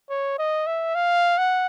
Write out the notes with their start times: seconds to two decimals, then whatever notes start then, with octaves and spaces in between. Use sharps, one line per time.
0.10 C#5
0.39 D#5
0.67 E5
0.95 F5
1.38 F#5